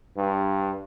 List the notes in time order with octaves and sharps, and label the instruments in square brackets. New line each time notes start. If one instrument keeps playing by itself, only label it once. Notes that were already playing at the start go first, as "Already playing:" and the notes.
[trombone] G2